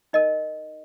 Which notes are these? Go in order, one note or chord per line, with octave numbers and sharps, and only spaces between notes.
D#4 A#4 D#5